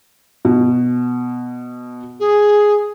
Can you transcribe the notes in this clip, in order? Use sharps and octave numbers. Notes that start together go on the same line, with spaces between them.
B2
G#4